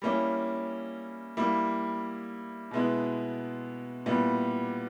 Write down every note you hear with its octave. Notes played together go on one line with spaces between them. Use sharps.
G3 A#3 C#4 E4
G3 A#3 E4
B2 G#3 B3 E4
A#2 G3 B3 E4